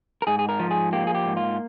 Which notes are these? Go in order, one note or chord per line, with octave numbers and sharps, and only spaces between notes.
A#4
G#2 G#4
G#4
A#4
F3
G#4
A#3 G4
G#4
G4
G#2
F4